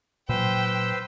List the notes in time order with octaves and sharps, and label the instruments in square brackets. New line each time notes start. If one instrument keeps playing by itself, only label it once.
[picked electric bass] A#2 F#3 [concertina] B4 C5 E6 [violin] G5